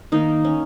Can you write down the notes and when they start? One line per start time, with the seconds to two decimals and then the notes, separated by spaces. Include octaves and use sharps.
0.12 D#3 A#3 D#4
0.45 C#4